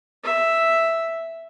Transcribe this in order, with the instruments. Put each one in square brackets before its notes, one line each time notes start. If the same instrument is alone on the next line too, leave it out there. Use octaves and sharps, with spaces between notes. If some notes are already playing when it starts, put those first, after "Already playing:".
[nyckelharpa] E5